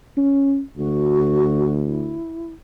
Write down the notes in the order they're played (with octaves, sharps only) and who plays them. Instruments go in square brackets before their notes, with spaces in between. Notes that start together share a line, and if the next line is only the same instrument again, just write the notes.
[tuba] C#4
[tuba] D2 [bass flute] F#4
[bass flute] E4